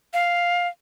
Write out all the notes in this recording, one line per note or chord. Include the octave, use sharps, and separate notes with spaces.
F5